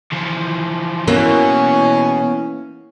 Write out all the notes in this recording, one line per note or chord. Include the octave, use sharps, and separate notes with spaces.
E3 F3
B2 E3 A#3 C#4